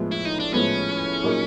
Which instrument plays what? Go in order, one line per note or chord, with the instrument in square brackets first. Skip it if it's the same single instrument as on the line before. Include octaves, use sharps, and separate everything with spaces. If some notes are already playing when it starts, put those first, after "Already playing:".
Already playing: [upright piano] A2 F3 G#3 B3
[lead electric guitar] E4
D#4
D4
[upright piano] A2 F3 G#3 B3 [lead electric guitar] C#4
[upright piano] A#2 F#3 A#3 D#4 G#4